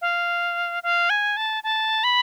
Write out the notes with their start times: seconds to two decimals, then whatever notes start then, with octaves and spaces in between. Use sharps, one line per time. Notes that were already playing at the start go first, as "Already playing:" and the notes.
0.01 F5
0.83 F5
1.10 G#5
1.37 A5
1.64 A5
2.04 B5